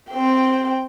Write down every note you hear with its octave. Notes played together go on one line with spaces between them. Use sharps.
C4 G5